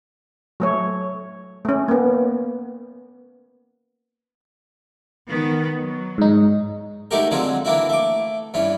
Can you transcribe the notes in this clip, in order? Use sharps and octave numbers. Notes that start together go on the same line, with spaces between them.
F#3 A3 C#5
A3 C#4
A#3 B3
D#3 B3
F#3
G#2 D#4
G#3 A3 D#4 F#4 G4 A#4
D3 F#3 G#3 C4 F4
E3 A#3 D4 E4 F#4
A3 D6
G2 E3 C#4